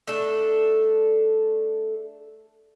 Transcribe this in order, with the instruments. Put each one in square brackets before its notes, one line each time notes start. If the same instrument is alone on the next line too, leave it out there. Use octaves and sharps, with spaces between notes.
[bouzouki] A3 D4 A4